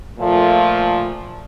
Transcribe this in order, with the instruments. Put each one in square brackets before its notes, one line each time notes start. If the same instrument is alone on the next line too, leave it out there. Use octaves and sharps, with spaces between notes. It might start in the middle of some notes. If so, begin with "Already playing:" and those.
[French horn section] A#2 F3 A3